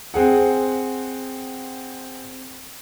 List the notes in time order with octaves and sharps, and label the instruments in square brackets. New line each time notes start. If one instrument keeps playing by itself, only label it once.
[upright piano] C4 G#4 F#5